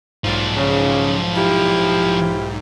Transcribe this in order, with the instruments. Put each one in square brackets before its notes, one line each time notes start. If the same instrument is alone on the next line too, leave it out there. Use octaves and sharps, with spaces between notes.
[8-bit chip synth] B1 G#2 [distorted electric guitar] F3 D5
[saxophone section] C#3
E4 F4 G4